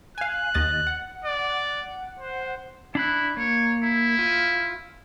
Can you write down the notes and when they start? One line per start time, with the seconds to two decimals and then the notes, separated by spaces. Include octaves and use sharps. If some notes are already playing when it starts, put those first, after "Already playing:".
0.18 F5 G#5 F#6
0.54 D#2 D#5 A6
0.87 F#5
1.25 D5
2.20 C5
2.95 D4 E4 B5 F#6
3.37 A#3 C#5
3.83 E4
4.19 F4